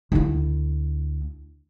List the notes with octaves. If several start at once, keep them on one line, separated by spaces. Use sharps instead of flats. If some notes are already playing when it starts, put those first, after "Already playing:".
D2 E4